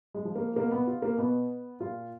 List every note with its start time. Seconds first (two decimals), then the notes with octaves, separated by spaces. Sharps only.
0.14 G#3
0.25 F3
0.35 A#3
0.56 B2 A#3
0.71 B3
0.87 F4
1.02 A#3
1.18 B2 B3
1.80 A#2 F4